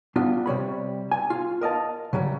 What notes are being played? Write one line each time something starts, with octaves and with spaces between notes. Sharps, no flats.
G3 B3 D4 F4
C3 G3 C#5 B5
G#5
F4
A#4 D#5 F5 A5
C#3 F#3 G3